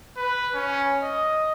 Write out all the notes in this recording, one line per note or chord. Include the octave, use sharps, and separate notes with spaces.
B4
C#4
D#5